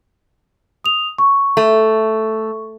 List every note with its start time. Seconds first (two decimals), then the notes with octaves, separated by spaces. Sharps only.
0.84 D#6 F7
1.18 C#6
1.57 A3